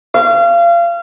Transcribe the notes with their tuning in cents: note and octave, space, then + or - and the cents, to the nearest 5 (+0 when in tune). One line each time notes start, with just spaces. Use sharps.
F5 -30